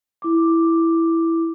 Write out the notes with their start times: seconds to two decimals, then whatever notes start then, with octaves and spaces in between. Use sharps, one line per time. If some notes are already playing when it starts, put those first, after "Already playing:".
0.22 E4 D6